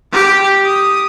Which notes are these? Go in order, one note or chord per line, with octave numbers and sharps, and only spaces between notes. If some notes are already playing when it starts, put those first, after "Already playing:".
G4
D#6